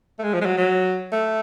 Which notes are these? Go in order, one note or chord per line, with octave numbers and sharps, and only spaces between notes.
A3
G#3
F3
G#3
F#3
F#3
A3